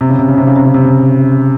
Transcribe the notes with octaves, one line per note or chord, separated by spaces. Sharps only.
C3
C#3
C3
C#3
C3
C#3
C3
C#3
C3
C#3